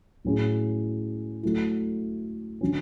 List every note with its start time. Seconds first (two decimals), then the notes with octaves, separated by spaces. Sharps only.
0.25 A2 F#3 C#4 E4 G#4
1.43 F#3 A3 E4
2.61 D3 F#3 C#4